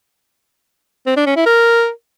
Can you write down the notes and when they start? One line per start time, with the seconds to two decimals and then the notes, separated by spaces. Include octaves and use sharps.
1.07 C4
1.16 D4
1.26 C#4
1.36 E4
1.46 A#4